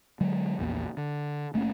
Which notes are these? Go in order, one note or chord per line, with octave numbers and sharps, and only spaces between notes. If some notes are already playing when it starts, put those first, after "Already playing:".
D3 F#3 G#3
A#1 E2 A#3
D3
F#1 A3 A#3 C#4